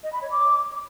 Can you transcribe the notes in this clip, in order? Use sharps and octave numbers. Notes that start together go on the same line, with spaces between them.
D#5
B5
C#5
D6